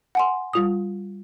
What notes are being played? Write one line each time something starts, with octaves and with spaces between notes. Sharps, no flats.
F#5 G#5 C6
G3 F4 D#6